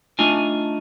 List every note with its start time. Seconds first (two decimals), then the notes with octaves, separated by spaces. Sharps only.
0.19 A3 D4 D#4 F4 G#5